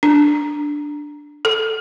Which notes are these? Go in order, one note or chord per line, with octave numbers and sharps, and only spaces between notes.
D4
A4